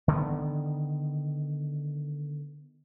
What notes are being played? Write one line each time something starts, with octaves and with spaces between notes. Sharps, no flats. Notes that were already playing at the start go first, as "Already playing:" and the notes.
D3 D#3 A#3 B3